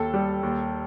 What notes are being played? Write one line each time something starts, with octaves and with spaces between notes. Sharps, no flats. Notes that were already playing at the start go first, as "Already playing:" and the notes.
Already playing: D#2 A4
G3
D#2